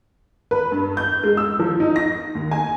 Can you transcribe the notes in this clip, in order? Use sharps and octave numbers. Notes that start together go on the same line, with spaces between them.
B4
G2
G6
G#3
E6
F3
D#4
A#6
D#2
G#5